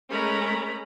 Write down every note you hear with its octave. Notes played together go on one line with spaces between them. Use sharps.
G#3 A3 C#4 A#4 A#5 B5